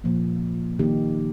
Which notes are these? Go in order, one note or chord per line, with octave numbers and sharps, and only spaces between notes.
A#2 F3 A#3
D#3 A#3 D#4 G4